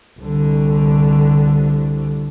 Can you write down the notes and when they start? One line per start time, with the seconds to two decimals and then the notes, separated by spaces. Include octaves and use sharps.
0.19 C2 D3